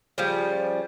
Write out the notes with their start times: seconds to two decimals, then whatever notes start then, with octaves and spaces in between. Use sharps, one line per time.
0.18 C#3 F3 G3